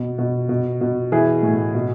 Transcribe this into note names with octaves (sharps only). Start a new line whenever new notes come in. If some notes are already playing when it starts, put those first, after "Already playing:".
Already playing: B2
B2
B2
B2
E3 G#4
A2
B2